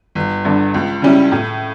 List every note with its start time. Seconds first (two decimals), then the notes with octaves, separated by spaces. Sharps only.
0.15 G1
0.45 G2 D3
0.74 C#2
1.02 C#3 G3 C#4 E4
1.32 A2